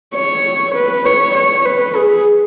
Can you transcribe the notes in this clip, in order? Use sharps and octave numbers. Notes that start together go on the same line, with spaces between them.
C#5
B4
C#5
C#5
B4
G#4